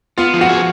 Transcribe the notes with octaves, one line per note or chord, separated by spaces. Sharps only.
B3 F4 F5
F3
F#4 F#5
G#4